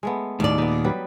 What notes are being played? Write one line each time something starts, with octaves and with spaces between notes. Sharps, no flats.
G#3 A3 B3
D#2 A2 D5
A#2 B3 D#4
F#3 G3 B4